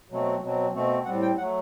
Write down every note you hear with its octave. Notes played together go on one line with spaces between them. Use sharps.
B2 F#3 A3 C4
B2 F#3 C4
B2 A3 C4
A2 G3 C4 F#5
G5
F#3 A3 F#5